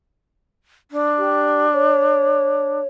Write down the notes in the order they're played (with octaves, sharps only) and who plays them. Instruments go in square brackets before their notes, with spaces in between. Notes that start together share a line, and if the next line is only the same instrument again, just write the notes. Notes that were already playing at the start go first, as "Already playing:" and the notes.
[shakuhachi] D4
[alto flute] G4
C#5